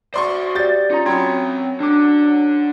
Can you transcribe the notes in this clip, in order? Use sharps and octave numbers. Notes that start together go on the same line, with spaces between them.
F#4 C5 D5 C6 C#6
G4 D5 G6 A6
C#4 D#4 F4 A#5
F#3 C4 C#4 G5 B5 C6 G#6
D3 D4 D6